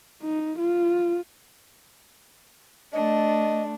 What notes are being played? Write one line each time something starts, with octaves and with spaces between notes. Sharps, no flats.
D#4
F4
A3 D4 D#5